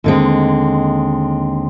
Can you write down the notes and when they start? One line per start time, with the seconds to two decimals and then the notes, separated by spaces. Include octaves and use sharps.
0.04 D#2 D3 G#3 C4